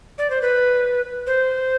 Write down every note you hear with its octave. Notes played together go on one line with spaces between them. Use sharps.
D5
C5
B4
C5